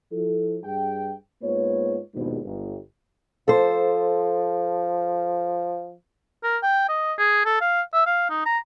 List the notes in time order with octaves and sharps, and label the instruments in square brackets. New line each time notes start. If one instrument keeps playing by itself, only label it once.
[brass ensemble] F3 E4 A4
G2 G#4 G5
G#2 A#3 B3 F4 B4 C#5
A#1 D#2 G#2 B2
G1
[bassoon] F3 [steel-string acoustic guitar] A4 C5
[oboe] A#4
G5
D#5
G#4
A4
F5
E5
F5
D#4
A#5